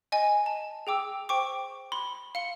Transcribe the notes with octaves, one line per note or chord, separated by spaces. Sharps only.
D#5 G#5
A5
G#4 G5 D6 E6
C5 G5 C#6 D6
B5 C6
F5 C#7 G7